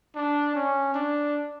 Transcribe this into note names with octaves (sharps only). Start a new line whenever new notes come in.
D4
C#4
D4